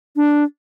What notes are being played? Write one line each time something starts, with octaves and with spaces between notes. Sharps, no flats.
D4